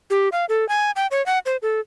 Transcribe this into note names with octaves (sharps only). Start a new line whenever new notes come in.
G4
F5
A4
G#5
G5
C#5
F#5
C5
A4